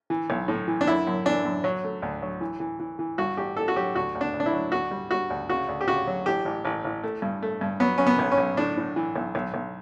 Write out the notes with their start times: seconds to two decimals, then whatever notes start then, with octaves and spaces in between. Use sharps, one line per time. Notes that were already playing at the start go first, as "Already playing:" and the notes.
0.10 E3
0.30 B1
0.48 A2
0.68 E3
0.81 D4
0.87 F#2 E4
1.07 F#2
1.25 E3 D4
1.45 F#2
1.64 F#3
1.84 A3
2.02 D2
2.22 F#3
2.41 E3
2.60 E3
2.80 E3
2.99 E3
3.18 G2 F#4
3.37 A1 G4
3.56 A1 A4
3.68 F#4
3.76 F#3 G4
3.95 D2 F#4
4.15 D2
4.21 D4
4.34 D2
4.40 D4
4.46 E4
4.53 F#3
4.72 D2 F#4
4.91 G3
5.11 G3 F#4
5.30 D2
5.49 C#3 F#4
5.68 D2
5.81 G4
5.88 C#3 F#4
6.07 F#3
6.26 A1 G4
6.45 A1
6.65 A1
6.84 A1
7.03 A3
7.22 G2
7.42 A3
7.61 G2
7.80 F#3 B3
7.98 F#3 C#4
8.07 B3
8.19 B1
8.31 C#4
8.38 B1
8.57 A2 D4
8.77 A2
8.96 E3
9.16 B1
9.35 B1
9.54 B1